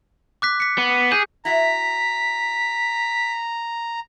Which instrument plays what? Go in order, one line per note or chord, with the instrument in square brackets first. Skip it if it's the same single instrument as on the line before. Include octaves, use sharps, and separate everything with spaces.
[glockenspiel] D6 F#6 B6
B6 C#7
[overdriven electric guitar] B3
[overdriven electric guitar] G#4 [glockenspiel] G6
[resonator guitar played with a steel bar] E4 F#4 E5 [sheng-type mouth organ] A#5 [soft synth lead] B6